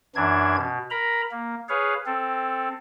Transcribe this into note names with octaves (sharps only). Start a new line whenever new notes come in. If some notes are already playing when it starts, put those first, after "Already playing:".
F#2 E3 D4 G#6
B2
A#4 A#5 B5
A#3
G#4 B4 C#5 F5
C4 A4